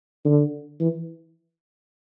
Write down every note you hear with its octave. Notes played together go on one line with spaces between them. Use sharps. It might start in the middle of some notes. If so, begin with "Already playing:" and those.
D3
E3